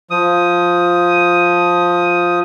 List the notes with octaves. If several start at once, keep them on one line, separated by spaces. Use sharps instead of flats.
F3 D#6